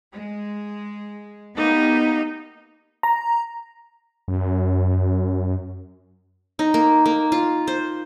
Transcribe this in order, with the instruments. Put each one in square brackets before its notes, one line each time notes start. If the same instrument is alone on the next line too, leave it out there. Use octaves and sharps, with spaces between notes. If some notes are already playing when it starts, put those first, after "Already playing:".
[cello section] G#3
[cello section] A#3 B3 G4 [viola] D#4
[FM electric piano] A#5
[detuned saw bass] F#2
[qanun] D#4
A#3
A#3
F4
C5